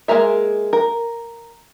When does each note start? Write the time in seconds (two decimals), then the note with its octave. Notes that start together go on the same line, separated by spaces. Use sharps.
0.08 G#3 A#3 G#4 A#4 E5
0.73 A#4